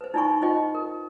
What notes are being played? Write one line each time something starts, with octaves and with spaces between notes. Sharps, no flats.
B4 C5
D#4 E4 D5 G#5 B5 C#6
D#4 F4 C5 D#5 G5 C#6
A#4